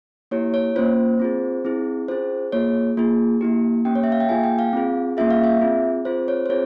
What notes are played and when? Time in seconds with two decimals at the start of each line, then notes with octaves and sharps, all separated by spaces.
0.31 A#3 E4 G4 C#5
0.54 C#5
0.76 A#3 C#4 F4 C5
1.20 C4 F4 G#4
1.65 C4 E4 G#4
2.08 C#4 F4 G#4 C5
2.52 A#3 F4 G#4 C#5
2.97 A#3 F4 G#4
3.41 A#3 E4 G4
3.85 A#3 C#4 G4 G5
3.96 C#5
4.03 E5
4.12 F5
4.20 G5
4.29 A#3 F4 G#4 G#5
4.44 G5
4.59 F5
4.73 C4 F4 G#4
5.17 A#3 C#4 F4 G#4 E5
5.31 F5
5.44 E5
5.61 C4 F4 G#4
6.05 C4 F4 G#4 C5
6.28 C#5
6.46 C5
6.50 C4 F4 G#4 C#5